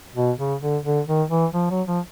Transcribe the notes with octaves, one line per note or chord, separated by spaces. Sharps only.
B2
C#3
D3
D3
D#3
E3
F3
F#3
F3